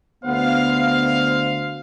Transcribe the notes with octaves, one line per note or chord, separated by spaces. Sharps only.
D2 B3 C5 F5